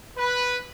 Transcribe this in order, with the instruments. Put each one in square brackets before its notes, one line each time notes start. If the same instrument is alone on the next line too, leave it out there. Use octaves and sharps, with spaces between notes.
[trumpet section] B4